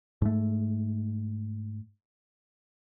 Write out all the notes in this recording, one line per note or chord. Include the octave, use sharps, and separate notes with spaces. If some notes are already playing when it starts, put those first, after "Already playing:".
G#2 A3